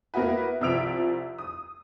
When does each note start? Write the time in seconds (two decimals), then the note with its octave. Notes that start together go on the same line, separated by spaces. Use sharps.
0.14 A#3 B3 E4 F#4 B4
0.61 C2 F3 E4 E6 D7 F7
1.38 D#6